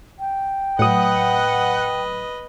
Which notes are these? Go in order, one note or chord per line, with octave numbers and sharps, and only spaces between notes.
G5
A2 F#3 B4 D#5 F#5 D#6